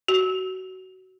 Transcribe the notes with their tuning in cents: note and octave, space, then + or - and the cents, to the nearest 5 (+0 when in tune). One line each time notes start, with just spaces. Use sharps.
F#4 +20